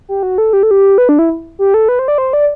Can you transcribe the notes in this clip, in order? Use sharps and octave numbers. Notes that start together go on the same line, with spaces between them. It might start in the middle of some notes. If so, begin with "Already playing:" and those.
G4
F#4
A4
G4
A4
G4
B4
D4
E4
G4
A4
B4
C5
D5
C5
D5